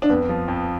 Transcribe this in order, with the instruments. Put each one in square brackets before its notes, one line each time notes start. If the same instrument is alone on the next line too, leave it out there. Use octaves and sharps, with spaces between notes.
[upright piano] D4
[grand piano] F2 [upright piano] B3
[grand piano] F3
F2